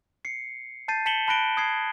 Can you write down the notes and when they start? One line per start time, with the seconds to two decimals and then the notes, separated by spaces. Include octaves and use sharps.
0.25 C7 C#7
0.88 A5 G6 A6 C7 D#7
1.06 A5 B6 C#7 E7 F#7 G7
1.28 A5 B5 F#6 A#6 D7 G7
1.57 D#6 G#6 C7